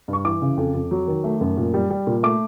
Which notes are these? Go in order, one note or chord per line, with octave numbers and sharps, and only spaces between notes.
G2
C#6
E3 D6
C#3
F2
F2
F#3
D#3
A3
F#2
A#2
G3
G3
A#2
A3 D6